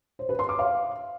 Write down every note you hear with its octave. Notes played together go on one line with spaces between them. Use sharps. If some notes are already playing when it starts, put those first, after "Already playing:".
C5
B4
C6
D6
F5